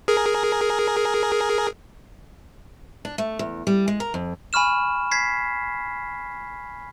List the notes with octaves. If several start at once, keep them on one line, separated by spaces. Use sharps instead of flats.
G#4 A#4
D4
A3
E2
G3
G#3
A#4
F2
G#5 B5 C#6 F6 E7
G#6 B6 C7